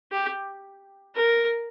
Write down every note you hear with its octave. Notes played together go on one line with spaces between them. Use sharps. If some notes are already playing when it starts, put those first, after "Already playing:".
G4
A#4